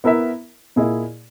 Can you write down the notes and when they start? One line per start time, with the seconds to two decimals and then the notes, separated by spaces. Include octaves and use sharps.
0.04 B3 E4 A#4 E5
0.76 A#2 A#3 E4 G#4 D#5